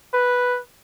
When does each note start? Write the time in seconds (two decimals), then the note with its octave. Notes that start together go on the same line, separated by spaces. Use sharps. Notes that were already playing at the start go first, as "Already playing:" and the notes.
0.14 B4